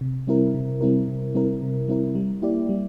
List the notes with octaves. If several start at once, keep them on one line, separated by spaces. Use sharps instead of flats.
C3
G3 C4 E4 A#4
C3
G3 C4 E4 A#4
C3
G3 C4 E4 A#4
C3
G3 C4 E4 A#4
G3
A#3 E4 G4 D5
G3